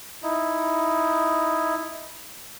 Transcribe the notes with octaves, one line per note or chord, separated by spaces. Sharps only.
D#4 E4